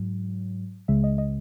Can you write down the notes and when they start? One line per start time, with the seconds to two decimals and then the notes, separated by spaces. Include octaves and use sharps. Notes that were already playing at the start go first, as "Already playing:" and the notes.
Already playing: G#2 F#3
0.88 C#2 C#3 G#3 E5
1.04 D#5
1.18 D#5